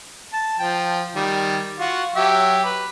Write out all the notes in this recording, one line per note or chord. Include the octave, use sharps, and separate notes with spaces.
A5
F3 G5
D#3 G3
F4 F#4
F#3 G4 E5
B4